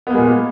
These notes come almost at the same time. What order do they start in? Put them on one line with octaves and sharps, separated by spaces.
B3 A#3 G#3 A#2